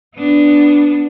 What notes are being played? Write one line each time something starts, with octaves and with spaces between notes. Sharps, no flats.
B3 D4